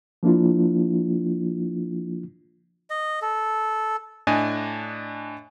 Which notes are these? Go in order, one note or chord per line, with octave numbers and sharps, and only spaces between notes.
F3 A#3 D4 E4 F4
D#5
A4
A2 D4 D5 D#5 G#5